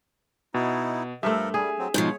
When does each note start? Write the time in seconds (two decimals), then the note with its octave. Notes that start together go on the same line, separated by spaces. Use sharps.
0.54 B2 D#4 E4
1.23 G2 F3 A3 A4 A#4 E5
1.54 G3 G#4
1.79 F#3 C4
1.94 G#2 B2 F3 C#5